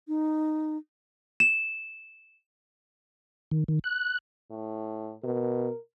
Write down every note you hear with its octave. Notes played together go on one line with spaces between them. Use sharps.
D#4
E7
D#3
D#3
F#6
A2
B2 A#4